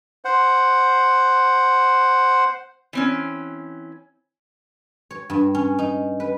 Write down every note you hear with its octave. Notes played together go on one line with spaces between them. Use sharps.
C5 F#5
E3 C4 C#4
C#5
G2
C#4
D#4
B4